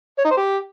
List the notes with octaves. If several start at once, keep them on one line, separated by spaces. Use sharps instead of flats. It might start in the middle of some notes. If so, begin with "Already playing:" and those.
C#5
D#4
C5
G4